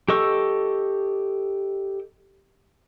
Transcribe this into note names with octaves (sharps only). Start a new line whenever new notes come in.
G4 A4 D#5 C#6 E6